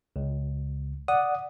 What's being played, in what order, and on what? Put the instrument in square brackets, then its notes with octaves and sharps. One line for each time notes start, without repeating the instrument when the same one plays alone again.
[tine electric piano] C#2
[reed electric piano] D5 F#5 [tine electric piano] D#6